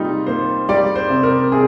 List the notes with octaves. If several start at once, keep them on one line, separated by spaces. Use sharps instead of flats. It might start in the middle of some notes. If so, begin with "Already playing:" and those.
Already playing: C3 G3 A#3 D#4 F4
A#3 C5
G3 D5
C5
C3
A#4
C3 G#4